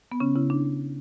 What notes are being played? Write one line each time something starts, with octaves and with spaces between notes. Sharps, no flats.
B3
C#3 C#4
C#3 E4
D4